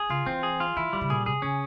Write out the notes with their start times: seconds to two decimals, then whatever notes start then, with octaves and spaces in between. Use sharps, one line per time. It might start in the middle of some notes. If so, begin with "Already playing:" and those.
Already playing: G#4
0.10 C#3 F4
0.26 E3 C4
0.43 G#4
0.60 F4
0.76 E3 E4
0.93 E3 G3
1.01 C#3
1.10 A#2 G#4
1.26 C3 G#4
1.42 C#3 C#4